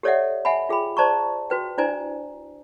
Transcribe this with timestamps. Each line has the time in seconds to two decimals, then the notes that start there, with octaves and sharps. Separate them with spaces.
0.03 G4 A4 C#5 D5 E5 F#5
0.45 E5 F#5 G#5 B5
0.69 F4 G#4 G5 B5
0.97 C5 D5 A5 A#5 C6 C#6
1.50 F#4 B4 G5
1.78 D4 E4 C5 D5 G#5 A#5